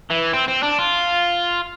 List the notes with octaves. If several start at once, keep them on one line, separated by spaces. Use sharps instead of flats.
E3
C4
C4
D4
F4